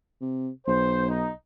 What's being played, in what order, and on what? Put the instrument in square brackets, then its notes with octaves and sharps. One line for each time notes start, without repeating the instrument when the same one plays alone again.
[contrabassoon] C3
[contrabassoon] B1 [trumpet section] C5
[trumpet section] D#4